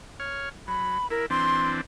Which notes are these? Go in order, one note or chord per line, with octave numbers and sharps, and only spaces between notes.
C#5 F6
F#3 B5
E4 A#4
E3 C4 D4 C6